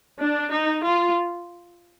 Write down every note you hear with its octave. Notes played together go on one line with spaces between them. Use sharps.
D4
D#4
F4